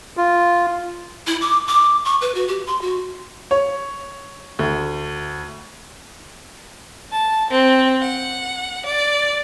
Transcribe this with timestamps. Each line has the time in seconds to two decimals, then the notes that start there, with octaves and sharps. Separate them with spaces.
0.17 F4
1.27 E4
1.41 D6
1.67 D6
2.05 C#6
2.21 B4
2.34 F#4
2.48 G4
2.67 C6
2.81 F#4
3.51 C#5
4.59 D2
7.12 A5
7.51 C4
8.01 F#5
8.86 D5